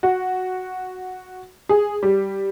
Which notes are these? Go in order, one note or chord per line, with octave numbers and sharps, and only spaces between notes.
F#4
G#4
G3